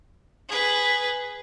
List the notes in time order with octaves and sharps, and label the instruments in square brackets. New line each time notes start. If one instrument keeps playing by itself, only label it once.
[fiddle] G#4 B4